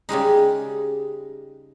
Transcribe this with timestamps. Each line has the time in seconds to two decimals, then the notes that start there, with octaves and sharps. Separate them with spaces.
0.09 C#3 G3 G#3 D#4